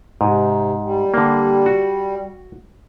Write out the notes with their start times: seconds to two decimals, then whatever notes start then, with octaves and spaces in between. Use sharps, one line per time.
0.21 G#2 C3
0.82 G3
1.14 D3 A#3
1.66 F#4